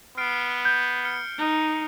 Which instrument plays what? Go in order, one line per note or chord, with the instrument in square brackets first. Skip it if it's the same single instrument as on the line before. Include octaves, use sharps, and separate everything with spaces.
[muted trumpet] B3 [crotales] F6 C7 D7
[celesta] G6
[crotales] F6 C#7 G7
[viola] D#4